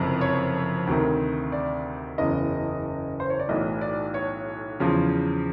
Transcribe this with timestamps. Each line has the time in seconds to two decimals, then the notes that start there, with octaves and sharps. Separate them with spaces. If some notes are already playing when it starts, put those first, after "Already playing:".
Already playing: F#1 F2 C3
0.21 C#5
0.87 D2 C3 D#3
1.52 D5
2.18 F#1 E2 C#3 D#5
3.20 C5
3.30 C#5
3.39 D5
3.49 B1 A2 E3 D#5
3.81 D5
4.14 C#5
4.80 E2 C#3 F3